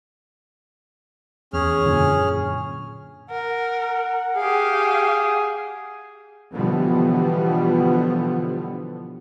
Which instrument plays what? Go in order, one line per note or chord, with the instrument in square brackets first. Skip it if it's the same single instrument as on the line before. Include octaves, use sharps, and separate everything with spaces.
[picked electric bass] E2 [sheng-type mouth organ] C#4 G#4 F6
[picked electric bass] F#2 A#2 D3
[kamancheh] A#4 [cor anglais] F#5
[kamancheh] G4 F5 [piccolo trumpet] G#4
[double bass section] B2 D3 E3 F3 G3 B3